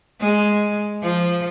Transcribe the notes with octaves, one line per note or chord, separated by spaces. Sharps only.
G#3
F3